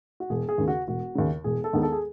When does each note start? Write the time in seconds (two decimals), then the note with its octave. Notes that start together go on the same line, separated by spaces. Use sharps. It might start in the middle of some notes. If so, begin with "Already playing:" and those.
0.20 F#4
0.30 E1 G#4
0.49 G#4
0.58 D#2 C#3
0.68 F#4
0.88 E1 F#4
1.15 D#2 C#3
1.44 E1 G#4
1.64 A4
1.73 D#2 D#3 G#3 B3
1.82 A4
1.92 G#4